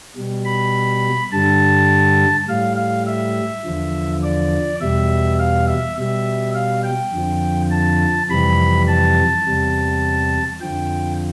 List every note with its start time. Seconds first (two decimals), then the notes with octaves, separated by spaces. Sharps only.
0.16 B2 G3
0.45 B5
1.32 G2 D3 G3 A5
2.48 A2 G3 F5
2.77 F5
3.07 E5
3.65 E2 D3 F3
4.23 D5
4.80 E2 B2 G3 E5
5.39 F5
5.67 E5
5.97 B2 G3 E5
6.55 F5
6.84 G5
7.13 F2 D3 F3
7.71 A5
8.29 F2 C3 E3 G3 B5
8.88 A5
9.46 E2 C3 G3
10.61 F2 D3 F3 G5